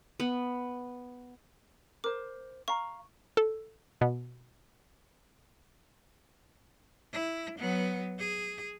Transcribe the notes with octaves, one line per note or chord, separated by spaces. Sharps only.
B3
A#4 C5 D6
F5 A#5 C#6
A4
B2
E4
F#3 B3
G#4